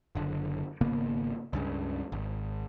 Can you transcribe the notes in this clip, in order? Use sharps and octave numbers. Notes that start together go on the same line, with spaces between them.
F#1 D3
G#1 C#3 A#3 B3
C#2 G2 C#3
G#1